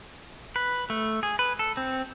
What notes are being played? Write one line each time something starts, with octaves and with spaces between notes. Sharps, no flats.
B4
A3
G#4
B4
A4
C4